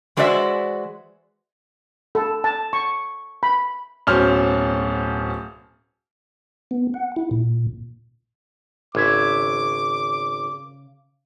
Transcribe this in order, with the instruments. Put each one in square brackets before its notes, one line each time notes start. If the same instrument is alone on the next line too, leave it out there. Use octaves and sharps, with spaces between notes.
[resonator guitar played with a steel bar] E3 G#3 F#4 C5 D5 E5
[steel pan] A4
A5
C#6
B5
[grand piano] D1 B2 C#4 C5 F6
[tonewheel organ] B3
F#5
E4
A#2
[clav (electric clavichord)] G#1 [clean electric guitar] C#3 C#5 E5 [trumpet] D6